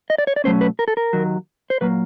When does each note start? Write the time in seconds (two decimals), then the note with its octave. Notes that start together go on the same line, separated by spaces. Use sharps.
0.10 D#5
0.18 D5
0.27 C#5
0.36 D5
0.44 B2 F#3 A3 C#4 C5
0.61 B4
0.79 A#4
0.88 A4
0.97 A#4
1.13 D#2 D#3 F#3
1.70 C5
1.81 A#2 F#3 A#3 B4